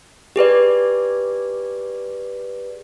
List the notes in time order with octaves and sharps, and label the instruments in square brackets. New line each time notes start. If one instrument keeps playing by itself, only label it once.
[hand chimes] G4 G#4 B4 D5